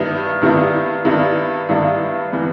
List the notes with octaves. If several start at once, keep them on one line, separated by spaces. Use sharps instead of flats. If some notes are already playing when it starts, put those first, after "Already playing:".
Already playing: G2 D#3 G3 B3 E4
G2 D#3 G3 B3 E4
G2 D#3 G3 B3 E4
G2 D#3 G3 B3 E4
E3 G3 B3